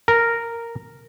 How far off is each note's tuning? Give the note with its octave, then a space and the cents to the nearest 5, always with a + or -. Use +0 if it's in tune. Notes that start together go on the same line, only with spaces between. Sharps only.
A#4 -5